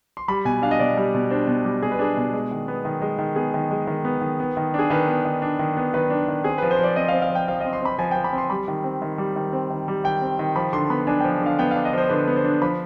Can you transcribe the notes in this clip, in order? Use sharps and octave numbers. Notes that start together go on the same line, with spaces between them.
C6
G3 B5
B2 G#5
D4 F5
D#5
B2 D5
G3
B2
D4 C5
B2
G3
B2 G#4
B4
D4 G#4
B2
G#3
D#3
B3
D#3
G#3
D#3
B3 G#4
D#3
G#3
D#3
B3
D#3
B3
D#3
D4 G#4
D#3 B4
B3
D#3
D4
D#3
B3
D#3 B4
D4
D#3
C4 G#4
F3 B4
C5
F3 D5
C4 D#5
C4 F5
F5
F3
G5
F3 F5
C4 D#5
C6
C4 B5
F3 G#5
F3 G5
B5
C4
C6
G3 B5
D#3
C4
D#3
G3
D#3
C4
D#3
G3
D#3 G5
C4
D#3
F3 B5
D3 C6
B3 B5
D4 G#5
F3 G5
D3 F5
B3 G5
D4 F5
D#5
F3 C5
D3 B4
B3
C5
D4
F3 B5